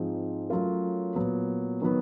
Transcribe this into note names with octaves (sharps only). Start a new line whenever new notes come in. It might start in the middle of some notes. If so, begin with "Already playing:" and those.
Already playing: G#2 F3 G#3 C4 D#4
F#3 A3 C#4 F4 A#4
A#2 F#3 B3
D#3 F#3 B3